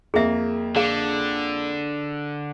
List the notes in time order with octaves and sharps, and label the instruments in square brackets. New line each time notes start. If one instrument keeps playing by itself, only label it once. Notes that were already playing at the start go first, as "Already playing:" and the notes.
[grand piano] F2 A#3 [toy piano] G#4 E5
[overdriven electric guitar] D3 [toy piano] G#4 F5